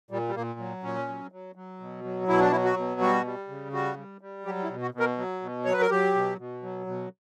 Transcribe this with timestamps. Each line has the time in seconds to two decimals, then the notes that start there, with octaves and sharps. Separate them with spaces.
0.10 A#2 G3
0.28 G3
0.35 A#2 A#3
0.59 F#3
0.83 A#2 C#4
1.08 F#3
1.32 F#3
1.56 F#3
1.80 B2
2.04 F#3
2.28 B2 E4
2.40 D4
2.52 F#3 E4
2.64 F#4
2.77 B2
3.01 G3 F#4
3.25 G3
3.48 C#3
3.72 G3 F#4
3.97 G3
4.21 G3
4.45 F#3 G4
4.63 E4
4.70 B2
4.82 F#4
4.94 B2
5.00 A#4
5.18 F#3
5.42 B2
5.65 F#3 C#5
5.73 B4
5.81 A#4
5.90 F#3 G4
6.15 B2
6.38 B2
6.63 F#3
6.87 B2